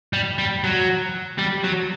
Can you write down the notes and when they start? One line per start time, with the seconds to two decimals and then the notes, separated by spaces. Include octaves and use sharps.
0.13 G3
0.38 G3
0.64 F#3
1.38 G3
1.64 F#3